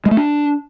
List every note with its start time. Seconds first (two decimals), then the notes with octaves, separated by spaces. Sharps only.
0.06 G#3
0.11 A3
0.17 D4